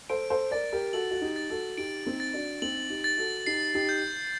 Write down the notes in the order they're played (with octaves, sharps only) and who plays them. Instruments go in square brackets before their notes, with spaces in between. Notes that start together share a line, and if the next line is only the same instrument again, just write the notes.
[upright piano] A4 C5 [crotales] D7
[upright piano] A4 C5
[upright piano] A#4 D5 [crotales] A6
[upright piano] G4 A#4
[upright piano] F#4 A4 [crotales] F#7
[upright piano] F#4
D#4 G4
[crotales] A6
[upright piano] F#4 A4
[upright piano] D#4 G4 [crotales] D7
[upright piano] C4 D#4
[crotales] A6
[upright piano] D4 F#4
[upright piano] C4 D#4 [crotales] F#7
[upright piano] D#4 G4
[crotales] A6
[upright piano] F#4 A4
[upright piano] D#4 G4 [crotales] C7
[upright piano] D#4 G4
[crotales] G6